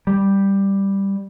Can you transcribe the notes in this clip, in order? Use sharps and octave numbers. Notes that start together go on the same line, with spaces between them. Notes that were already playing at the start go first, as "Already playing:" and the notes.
G3